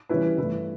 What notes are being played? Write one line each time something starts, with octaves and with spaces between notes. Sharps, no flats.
E3 G3 C#4 E4 B4
G2 E3 A3 E4 B4